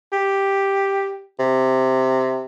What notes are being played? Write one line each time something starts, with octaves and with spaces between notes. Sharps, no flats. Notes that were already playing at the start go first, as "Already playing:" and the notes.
G4
C3